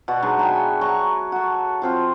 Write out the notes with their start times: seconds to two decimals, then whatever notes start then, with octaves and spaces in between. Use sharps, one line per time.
0.08 B2 B3 F#4 D5
0.22 F#3 G#3 D4 D#4
0.39 F#4 E5 G5 G#5
0.81 F#3 A#5 C#6
1.32 F#4 A4
1.82 F3 C4 F4